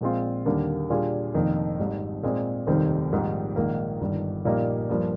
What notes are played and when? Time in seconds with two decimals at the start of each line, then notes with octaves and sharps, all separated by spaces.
0.01 A#1 A#2 G#3 C4 F4
0.46 D#2 D3 G3 A#3 D4
0.90 A#2 G3 D4 F4 G#4
1.34 F1 F2 D#3 A#3
1.79 G#1 G#2 G3
2.23 A#2 G#3 C4
2.67 F1 D#2 D#3 G3 C4
3.12 A#1 G#2 D#3 G3
3.56 A#1 G#2 D#3 A#3
4.01 G1 G2 D#3
4.45 A#1 A#2 G3 A#3 D#4
4.89 G2 F3 A#3